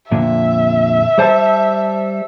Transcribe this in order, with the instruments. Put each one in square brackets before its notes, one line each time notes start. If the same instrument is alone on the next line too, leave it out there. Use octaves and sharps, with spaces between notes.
[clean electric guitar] F2 A#2 D3 [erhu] E5
[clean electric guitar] G3 C5 A5